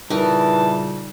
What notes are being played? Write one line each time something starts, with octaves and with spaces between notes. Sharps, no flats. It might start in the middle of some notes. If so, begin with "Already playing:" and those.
A#2 C#3 E3 G3 D#4 A#4 A5